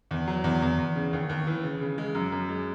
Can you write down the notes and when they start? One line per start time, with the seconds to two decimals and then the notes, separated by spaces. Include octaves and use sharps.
0.11 E2
0.28 F#3
0.44 E2
0.62 E2
0.78 E2
0.96 C#3
1.13 D#2
1.29 D#2
1.47 E3
1.64 C#3
1.81 C#3
1.98 G#3
2.15 F#2
2.32 F#2
2.49 G#3